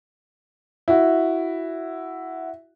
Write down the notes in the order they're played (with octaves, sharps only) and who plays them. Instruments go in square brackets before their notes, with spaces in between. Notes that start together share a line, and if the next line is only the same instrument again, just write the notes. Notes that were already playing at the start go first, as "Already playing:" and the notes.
[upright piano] E4 F#4